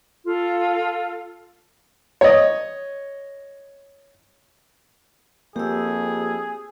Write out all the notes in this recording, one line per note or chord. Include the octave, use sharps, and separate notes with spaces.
F4 A4
C#5 D#5
F2 A#3 G4 G#4 E6